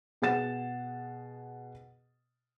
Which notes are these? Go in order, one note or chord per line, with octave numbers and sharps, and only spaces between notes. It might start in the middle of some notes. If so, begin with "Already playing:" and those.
B2 G#4 F#5 A6 E7